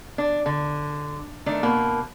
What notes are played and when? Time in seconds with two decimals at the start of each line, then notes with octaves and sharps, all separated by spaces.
0.18 D4
0.46 D3
1.46 D#3 A3 D4
1.63 B2 A#3